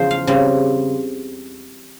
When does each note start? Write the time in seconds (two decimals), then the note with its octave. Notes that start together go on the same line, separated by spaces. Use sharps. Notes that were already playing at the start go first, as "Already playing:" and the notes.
Already playing: E2 C#3 F3 G#4 C5
0.11 F5
0.27 C#3 G3 C4